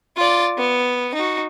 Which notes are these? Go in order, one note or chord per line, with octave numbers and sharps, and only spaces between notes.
F4 D5
B3
D#4 F#4